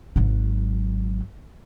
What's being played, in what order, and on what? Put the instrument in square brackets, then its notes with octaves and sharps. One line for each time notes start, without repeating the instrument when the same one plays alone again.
[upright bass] G#1 F#3